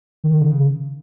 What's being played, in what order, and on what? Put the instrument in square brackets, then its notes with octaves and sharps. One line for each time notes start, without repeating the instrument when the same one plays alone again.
[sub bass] D#3
C#3